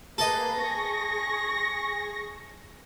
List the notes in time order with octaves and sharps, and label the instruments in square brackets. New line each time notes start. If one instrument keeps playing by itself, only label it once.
[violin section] A#3 G#4 B4 [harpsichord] A4 D#5
[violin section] G#4 C#6 A#6